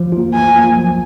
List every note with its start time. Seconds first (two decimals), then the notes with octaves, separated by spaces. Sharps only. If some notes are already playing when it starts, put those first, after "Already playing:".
Already playing: F3
0.12 A#3 F4
0.34 F3 G#5
0.56 A#3 F4
0.77 F#3